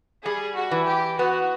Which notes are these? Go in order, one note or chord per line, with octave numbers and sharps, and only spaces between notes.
G3 G#4
F#4
E3
G4
B3 F#4